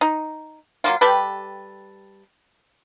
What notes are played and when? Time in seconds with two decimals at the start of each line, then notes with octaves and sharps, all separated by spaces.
0.01 D#4
0.84 F#3 A#3 F4
1.01 G3 G4 A4 B4